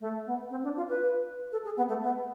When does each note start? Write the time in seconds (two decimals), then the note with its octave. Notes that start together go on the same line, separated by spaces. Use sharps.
0.01 A3
0.26 B3
0.51 C4
0.64 D4
0.77 F4
0.89 B4
1.52 A4
1.65 G#4
1.77 B3
1.89 A3
2.02 B3